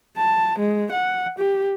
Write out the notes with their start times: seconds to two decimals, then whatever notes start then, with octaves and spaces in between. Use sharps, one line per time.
0.18 A5
0.59 G#3
0.92 F#5
1.39 G4